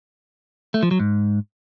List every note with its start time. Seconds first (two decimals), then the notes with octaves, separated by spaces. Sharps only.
0.74 A3
0.83 F3
0.91 F#3
1.00 G#2